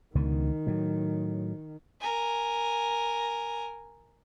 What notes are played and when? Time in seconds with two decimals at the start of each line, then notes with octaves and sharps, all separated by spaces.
0.15 C#2 B2 D3 D#3
0.67 A2 F#3
2.00 A#4 G#5